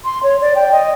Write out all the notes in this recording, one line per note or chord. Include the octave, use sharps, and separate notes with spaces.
C6
C#5
D5
G5
D#5